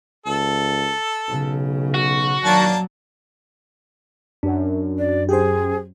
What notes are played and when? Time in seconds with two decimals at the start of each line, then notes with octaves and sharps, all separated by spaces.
0.26 C#2 A4
1.29 B1 C#3
1.94 F#4
2.45 D#3 F#3 A#3 D4 A5
4.43 F#2 D4
4.98 D5
5.29 G4 G#4 C5